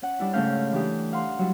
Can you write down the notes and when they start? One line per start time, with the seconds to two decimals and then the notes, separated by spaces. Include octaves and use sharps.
0.02 C#4 F#5
0.19 G3 D4 E4
0.33 G#2 C#3 A3 C#4 F5 G6
0.72 E3 D4 G4 D#6
1.13 F5 F#5 A#5 C6
1.38 F#3 G3 E4